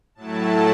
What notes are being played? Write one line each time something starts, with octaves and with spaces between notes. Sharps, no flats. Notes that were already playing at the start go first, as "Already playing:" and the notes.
A2 F#3 A3 E4 A5